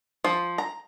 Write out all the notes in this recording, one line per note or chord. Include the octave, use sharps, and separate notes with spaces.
F3
A#5